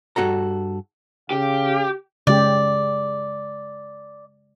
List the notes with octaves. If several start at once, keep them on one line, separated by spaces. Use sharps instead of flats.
G2 F#4 A4 A#5
C#3 G4 F5
C#3 G#3 G4 D5